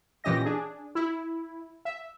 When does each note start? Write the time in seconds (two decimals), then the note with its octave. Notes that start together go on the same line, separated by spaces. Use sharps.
0.24 A#2 E3 C#4 G4 D#5 A#6
0.45 D4 G#4
0.95 E4
1.85 E5